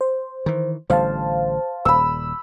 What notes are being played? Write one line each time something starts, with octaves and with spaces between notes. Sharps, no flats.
C5
D#3 E3
A1 D3 G3 C5 F5 A5
D#1 B5 E6